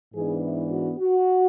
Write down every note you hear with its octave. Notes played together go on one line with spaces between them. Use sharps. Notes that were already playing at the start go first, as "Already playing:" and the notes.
G#2 E3 B3 D4 G#4
E4
F#4
F#4